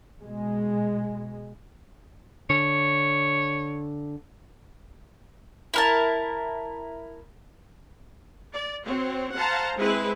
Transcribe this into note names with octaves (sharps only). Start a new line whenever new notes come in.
B2 G#3
D3 C#5
E4 A#4 A5
D5
C4 F#4 C#5
C5 F5 F#5 A5 A#5
G#3 C4 E4 B4